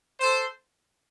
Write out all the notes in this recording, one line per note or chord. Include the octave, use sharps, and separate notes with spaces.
A4 C5